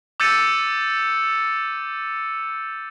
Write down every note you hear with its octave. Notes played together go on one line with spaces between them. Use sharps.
D6 E6 G6 A6 C#7 D#7